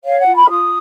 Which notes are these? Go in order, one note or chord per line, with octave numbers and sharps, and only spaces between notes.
C#5 F5
F#5
F4
B5
F6
F4 D#6